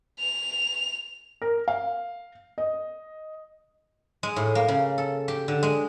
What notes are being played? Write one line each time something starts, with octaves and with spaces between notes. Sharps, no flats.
F7
A#4
F5
D#5
G#3
A2
A#3
C#3
A4
G4
D3
G#3